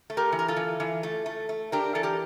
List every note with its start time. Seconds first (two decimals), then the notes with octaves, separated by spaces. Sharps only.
0.10 A3
0.17 G4 A#4
0.32 E3
0.39 A#4
0.48 F4 A4
0.56 E3
0.80 E3
1.03 A3
1.26 A3
1.49 A3
1.72 D4 G4 A#4
1.95 E3 A4
2.03 G4 A#4